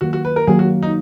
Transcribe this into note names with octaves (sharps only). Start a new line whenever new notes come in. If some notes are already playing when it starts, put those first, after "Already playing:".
D#3 F#3 A#3 F#4
F#4
B4
A#4
D#3 F#3 A#3 G#4
F#4
D#4